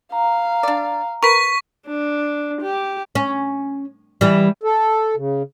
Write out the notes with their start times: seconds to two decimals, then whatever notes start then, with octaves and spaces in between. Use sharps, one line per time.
0.12 F5 A#5
0.63 D4 D5
1.23 A#4 B4 C#6 B6
1.87 D4
2.62 G4
3.15 C#4
4.21 E3 G3
4.63 A4
5.17 C#3